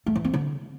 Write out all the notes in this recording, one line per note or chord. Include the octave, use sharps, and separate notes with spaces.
A3
E3
C4
D3